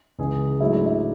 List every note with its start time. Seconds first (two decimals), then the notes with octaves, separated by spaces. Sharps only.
0.19 C#2 C#3 E3 G#3 G#4
0.60 G#2 F#3 A3 E4
0.73 D4
0.86 E4